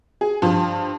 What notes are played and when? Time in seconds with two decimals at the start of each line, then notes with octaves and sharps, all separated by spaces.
0.21 G#4
0.42 G2 F3